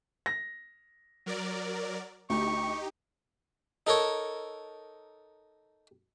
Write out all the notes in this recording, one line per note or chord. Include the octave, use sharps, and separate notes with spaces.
A#6
F#3 A#4 D5
D2 D#4 G4 C#6
D#4 A4 A#4 C#5